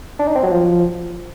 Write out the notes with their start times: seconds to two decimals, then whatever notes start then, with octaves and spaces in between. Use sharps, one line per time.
0.19 D4
0.27 D#4
0.35 C4
0.43 F#3
0.51 F3